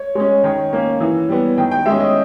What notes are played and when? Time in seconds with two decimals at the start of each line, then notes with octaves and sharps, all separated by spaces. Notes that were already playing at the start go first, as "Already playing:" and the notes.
Already playing: C#5
0.15 G#3 C#4 C#5
0.44 D#3 C#5
0.73 A#3 C#4
1.00 E3
1.29 G3 B3
1.57 D#3 G5
1.71 G5
1.86 G#3 C#4 E5
2.00 D#5